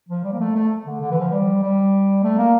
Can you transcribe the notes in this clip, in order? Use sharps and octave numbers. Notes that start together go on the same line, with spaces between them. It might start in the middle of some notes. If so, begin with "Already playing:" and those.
F3
G3
A#3
A3
A3
D3
D3
E3
F3
G3
G3
A3
A#3